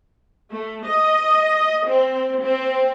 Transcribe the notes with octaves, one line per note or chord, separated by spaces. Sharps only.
A3
D#5
C4
C4